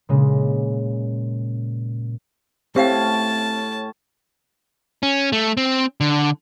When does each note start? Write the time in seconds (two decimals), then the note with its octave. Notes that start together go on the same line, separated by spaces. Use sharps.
0.09 A#2 C#3 G#3
2.76 A2 C4 C#4 G4 F5 G5 A5
5.03 C#4
5.32 A3
5.57 C4
6.01 D3